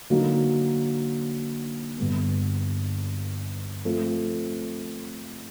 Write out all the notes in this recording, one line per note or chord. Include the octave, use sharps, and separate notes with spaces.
D3 F#3 A#3 D#4 F#4
G2 D3 G3 B3
F3 A3 C4